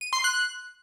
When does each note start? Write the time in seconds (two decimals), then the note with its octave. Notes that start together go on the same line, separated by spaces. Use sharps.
0.01 D#7
0.13 C6
0.24 F#6